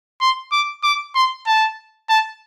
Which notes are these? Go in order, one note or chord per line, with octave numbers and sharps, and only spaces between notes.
C6
D6
D6
C6
A5
A5